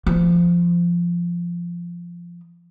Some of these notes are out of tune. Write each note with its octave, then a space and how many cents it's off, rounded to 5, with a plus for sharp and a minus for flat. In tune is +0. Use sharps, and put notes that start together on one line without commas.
F3 -10